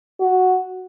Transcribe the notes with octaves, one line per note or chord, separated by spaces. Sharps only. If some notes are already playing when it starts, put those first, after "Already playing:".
F#4